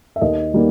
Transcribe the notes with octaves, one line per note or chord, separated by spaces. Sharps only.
E5
D#2 D#5
D#3 G3 A#3